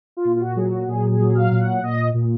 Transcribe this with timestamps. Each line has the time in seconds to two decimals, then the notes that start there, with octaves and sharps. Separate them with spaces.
0.17 F4
0.25 A#2
0.36 F4
0.40 F#4
0.56 F#3 G#4
0.64 F#4
0.88 A#2 G#4
1.11 G#4
1.20 F#3
1.35 F5
1.51 A#2
1.59 F#5
1.82 A#2 D#5
2.14 A#2